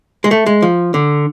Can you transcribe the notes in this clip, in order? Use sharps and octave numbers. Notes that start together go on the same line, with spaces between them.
G#3
A3
G#3
F3
D3